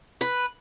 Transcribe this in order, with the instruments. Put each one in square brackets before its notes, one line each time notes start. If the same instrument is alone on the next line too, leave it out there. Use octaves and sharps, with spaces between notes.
[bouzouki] B4